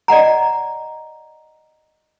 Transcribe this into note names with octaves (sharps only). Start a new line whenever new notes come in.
D5 D#5 F#5 A#5